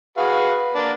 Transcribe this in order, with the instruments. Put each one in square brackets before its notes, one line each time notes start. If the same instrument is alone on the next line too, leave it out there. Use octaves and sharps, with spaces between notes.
[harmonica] F#4 G#4 F5 [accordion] B4
[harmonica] A#3 D4